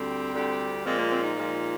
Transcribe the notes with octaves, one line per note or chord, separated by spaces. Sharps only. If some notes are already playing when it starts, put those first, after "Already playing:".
Already playing: D2 D3 G3 C4
D2 D3 G3
A#2 F3 G#3 C4
A#3
C4
D#4
A#2 F3 G#3